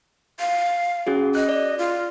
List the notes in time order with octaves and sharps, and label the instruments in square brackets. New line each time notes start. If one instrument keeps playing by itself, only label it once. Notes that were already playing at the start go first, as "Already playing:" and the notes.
[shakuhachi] F5
[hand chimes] C#4 F#4 G#4
[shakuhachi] D#5 [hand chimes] F#6
[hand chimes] D5
[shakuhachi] F4